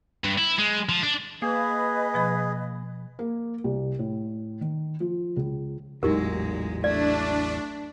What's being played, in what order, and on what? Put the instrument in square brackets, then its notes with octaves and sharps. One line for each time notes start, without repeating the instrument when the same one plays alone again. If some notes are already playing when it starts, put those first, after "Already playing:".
[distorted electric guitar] G2
E4
G#3
F3
D4
[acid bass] A#3 [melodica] G#4 [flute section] B4 D#5
[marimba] B2 F3 B5
[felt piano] A#3
C2
A2
D#3
F3
C#2
[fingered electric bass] A1 E2 F#3 [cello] A#2 G#3 [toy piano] D#4 G4 A#4
[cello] A3 [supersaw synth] D4 [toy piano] D5